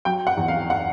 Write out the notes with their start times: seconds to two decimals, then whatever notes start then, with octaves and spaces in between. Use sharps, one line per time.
0.05 F#3 G5
0.27 F#5
0.37 E2
0.48 F5
0.70 F#5